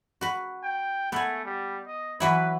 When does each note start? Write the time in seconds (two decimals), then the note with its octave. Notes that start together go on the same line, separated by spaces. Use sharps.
0.21 F#4 B4
0.63 G5
1.12 A3 B3 G#5
1.45 G3
1.87 D#5
2.20 E3 F#3 E4 B4